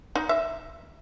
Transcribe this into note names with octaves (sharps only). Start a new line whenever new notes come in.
D#4
E5